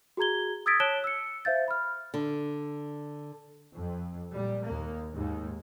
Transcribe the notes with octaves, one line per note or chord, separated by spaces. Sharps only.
F#4 G#4 A#5 G#6 G7
D#6 E6 G#6 A6 B6 D7
C#5 A5 F#6 D7 E7 G7
E6 C#7
C5 E5 F5 G6 A6
B5 F6
D3
F2
A#2 G3
D#2 A#3
D#2 G#2